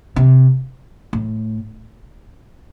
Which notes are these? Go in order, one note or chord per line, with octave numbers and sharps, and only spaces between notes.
C3
A2